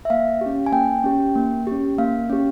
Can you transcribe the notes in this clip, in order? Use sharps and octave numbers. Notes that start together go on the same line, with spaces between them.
E5
A#3 F5
C#4 G4
G#5
A#3 G5
C#4 G4
A#3
C#4 G4
A#3 F5
C#4 G4